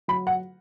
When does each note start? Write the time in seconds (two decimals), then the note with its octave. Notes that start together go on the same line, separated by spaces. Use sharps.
0.08 F#3 B5
0.27 F#5